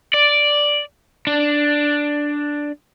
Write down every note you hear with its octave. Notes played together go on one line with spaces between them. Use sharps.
D5
D4